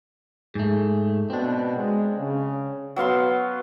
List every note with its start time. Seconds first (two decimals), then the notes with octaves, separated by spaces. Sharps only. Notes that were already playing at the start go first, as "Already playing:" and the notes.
0.55 G#2 A3 G#4
1.30 B2 C4 D4
1.76 G#3
2.18 C#3
2.96 F#3 B3 F5 C6